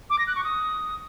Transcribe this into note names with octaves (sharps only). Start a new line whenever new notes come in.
D6
A#6
F#6
C#6
D#6